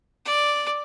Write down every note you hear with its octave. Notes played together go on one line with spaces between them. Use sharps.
D5